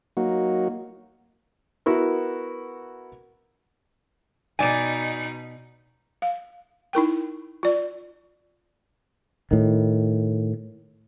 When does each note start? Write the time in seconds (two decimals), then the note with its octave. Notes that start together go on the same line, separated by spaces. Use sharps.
0.17 F#3 A#3 D#4 F#4
1.86 B3 E4 F#4 A#4
4.59 B2 D#4 D5 G#5
6.22 F5
6.93 D#4 E4 A#4 G5
7.63 F4 D5
9.51 A2 D#3